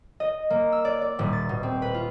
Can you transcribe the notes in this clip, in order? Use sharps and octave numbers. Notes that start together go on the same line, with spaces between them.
D#5
A#3
E6
D5
D5
D#1
A6
B2
C4
B4
F4